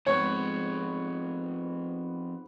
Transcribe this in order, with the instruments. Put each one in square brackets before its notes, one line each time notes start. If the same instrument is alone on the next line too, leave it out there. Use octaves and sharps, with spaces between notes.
[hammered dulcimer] G#2 B3 [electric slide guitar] F3 C4 G4 [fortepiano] C#5